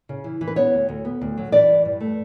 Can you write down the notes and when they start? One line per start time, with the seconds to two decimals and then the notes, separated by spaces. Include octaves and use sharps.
0.09 C#3
0.24 E3
0.41 E3
0.47 B4
0.56 B3 C#5
0.73 D2
0.89 D2
1.05 B3
1.21 D2
1.38 F#3
1.52 E3 D5
1.69 G2
1.85 G2
2.01 A3